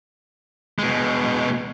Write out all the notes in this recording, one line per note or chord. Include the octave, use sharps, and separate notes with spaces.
B2 G#3